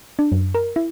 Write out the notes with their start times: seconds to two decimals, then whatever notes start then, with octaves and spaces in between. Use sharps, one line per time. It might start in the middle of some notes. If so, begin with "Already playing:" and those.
0.19 D4
0.32 F#2
0.54 A#4
0.76 E4